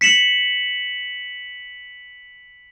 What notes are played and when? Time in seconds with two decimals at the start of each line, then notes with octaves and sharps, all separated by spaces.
0.01 B6 C#7 E7 F#7